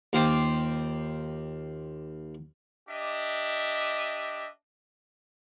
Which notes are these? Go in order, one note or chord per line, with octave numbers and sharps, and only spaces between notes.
D#2 F4 C5 G5 D6
D4 G4 D#5 E5